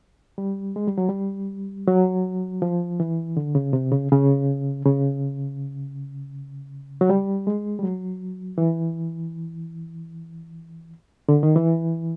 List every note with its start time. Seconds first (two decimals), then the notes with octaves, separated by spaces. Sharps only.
0.38 G3
0.76 G#3
0.87 G3
0.98 F#3
1.09 G3
1.88 F#3
2.62 F3
3.00 E3
3.37 D3
3.55 C#3
3.73 C3
3.92 C#3
4.12 C#3
4.85 C#3
7.01 F#3
7.10 G3
7.47 G#3
7.79 G3
7.83 F#3
8.58 E3
11.29 D3
11.43 D#3
11.56 E3